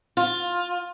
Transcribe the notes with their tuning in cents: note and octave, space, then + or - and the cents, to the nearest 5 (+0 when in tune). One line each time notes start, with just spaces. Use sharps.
F4 +15